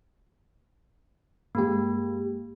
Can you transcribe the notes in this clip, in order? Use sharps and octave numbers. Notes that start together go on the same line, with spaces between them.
G2 G#3 A#3 G4